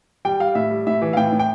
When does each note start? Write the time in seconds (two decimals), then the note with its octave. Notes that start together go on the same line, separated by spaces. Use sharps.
0.25 G3 G5
0.40 G3 F5
0.55 A2 E5
0.71 G3
0.87 A2 E5
1.02 E3
1.13 F5
1.17 A2 G5
1.32 A2
1.39 G5